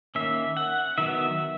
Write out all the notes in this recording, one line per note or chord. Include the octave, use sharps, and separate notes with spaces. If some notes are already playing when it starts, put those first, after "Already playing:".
D#3 A#3 C#4 E5
F#5
D#3 F#3 B3 E5